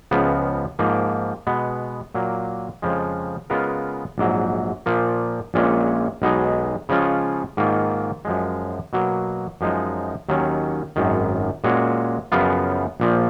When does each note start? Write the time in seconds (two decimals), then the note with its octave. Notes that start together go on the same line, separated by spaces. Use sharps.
0.11 C#2 C#3 F3 B3
0.79 G#2 F3 A#3
1.47 B2 G#3 B3
2.15 A#2 F#3 A#3
2.82 F2 C#3 F3 G#3
3.50 C#3 G#3 B3 F4 A#4
4.18 A#1 G#2 F#3
4.86 A#2 F3 A#3
5.54 A#1 A#2 G#3 C#4
6.22 B1 B2 G#3 D#4
6.89 C#3 F3 G#3 C#4 F4
7.57 G#2 D#3 A#3 F4
8.25 F#2 F3 G#3
8.93 B2 F#3 A#3
9.61 F#2 F3 G#3 D#4
10.29 D#2 D#3 F#3 C#4
10.96 G#1 F#2 D#3
11.64 A#2 G#3 C#4 F#4
12.32 F#2 C#3 F3 B3 F4
13.00 A#1 A#2 F3